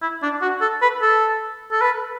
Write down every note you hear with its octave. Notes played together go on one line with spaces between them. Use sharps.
E4
D4
F#4
A4
B4
A4
A4
B4